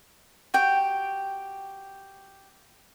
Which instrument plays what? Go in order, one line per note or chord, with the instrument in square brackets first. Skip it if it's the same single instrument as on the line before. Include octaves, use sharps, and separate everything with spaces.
[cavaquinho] F#4 G4 G5